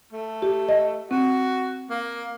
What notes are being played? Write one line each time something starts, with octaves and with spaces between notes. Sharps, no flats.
A3
G4
D#5
C4 F#4
A#3